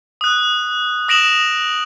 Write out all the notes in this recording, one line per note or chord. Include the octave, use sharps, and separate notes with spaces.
D#6 F#6
D#6 A#6 D7 E7 F#7